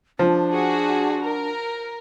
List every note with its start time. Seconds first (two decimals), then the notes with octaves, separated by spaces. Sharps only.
0.19 F3 D4
0.53 F#4 G#4
1.22 A#4